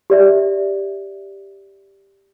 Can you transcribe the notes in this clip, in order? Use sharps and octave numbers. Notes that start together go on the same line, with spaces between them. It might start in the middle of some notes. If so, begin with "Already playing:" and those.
G4 D5 E5